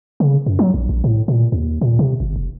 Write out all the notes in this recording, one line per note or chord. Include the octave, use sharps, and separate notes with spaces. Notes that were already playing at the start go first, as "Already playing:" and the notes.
C#3
F#2
F#3
A#1
A#1
A2
A#2
D#2
A#2
C3
G1
F1